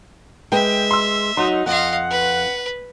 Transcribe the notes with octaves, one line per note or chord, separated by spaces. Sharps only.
G#3 B4 E5 G5
C6 E6
F#3 D#4 C6
F2 D#5 F5 F#5
B4